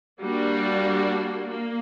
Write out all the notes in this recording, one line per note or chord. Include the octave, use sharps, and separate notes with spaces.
G3 A#3 D4 F#4
A#3